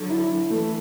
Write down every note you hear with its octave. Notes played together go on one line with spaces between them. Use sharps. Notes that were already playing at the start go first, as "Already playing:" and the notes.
Already playing: D3 F#3
E4
E4
E3 A3